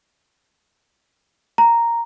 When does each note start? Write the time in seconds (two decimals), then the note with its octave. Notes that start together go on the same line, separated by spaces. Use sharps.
1.58 A#5